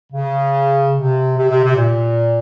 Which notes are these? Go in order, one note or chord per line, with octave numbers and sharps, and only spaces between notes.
C#3
C3
C3
C3
C3
A#2